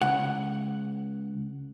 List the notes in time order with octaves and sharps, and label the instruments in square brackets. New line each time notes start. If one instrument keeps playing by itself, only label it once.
[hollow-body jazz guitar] C#2 F#5